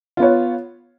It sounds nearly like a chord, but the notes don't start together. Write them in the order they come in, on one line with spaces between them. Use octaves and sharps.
F4 B3 C#5